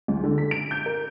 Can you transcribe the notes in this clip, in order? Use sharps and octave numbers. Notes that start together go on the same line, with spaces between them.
C#2
D3
B6
D7
G6
A#4